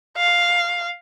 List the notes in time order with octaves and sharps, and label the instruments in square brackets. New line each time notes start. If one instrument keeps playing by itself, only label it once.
[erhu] F5